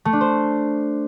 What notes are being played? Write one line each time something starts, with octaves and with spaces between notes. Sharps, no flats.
A3
D4
C5